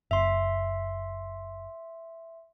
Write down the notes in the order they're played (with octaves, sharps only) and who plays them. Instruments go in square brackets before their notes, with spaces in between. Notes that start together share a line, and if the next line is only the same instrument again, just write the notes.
[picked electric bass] F#1 [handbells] E5 C6